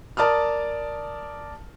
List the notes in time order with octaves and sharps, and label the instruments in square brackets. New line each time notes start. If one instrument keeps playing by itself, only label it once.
[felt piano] A#4 D5 A5 D#6 F6